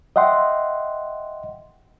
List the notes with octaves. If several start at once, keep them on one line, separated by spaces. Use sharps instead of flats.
D#5 E5 F#5 G5 C6